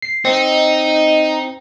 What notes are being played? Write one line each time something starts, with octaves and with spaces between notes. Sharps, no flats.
C7
C4 D#4